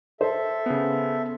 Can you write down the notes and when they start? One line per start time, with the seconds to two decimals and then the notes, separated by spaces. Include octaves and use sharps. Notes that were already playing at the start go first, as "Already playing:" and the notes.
0.21 A4 C5 E5
0.66 C#3 B3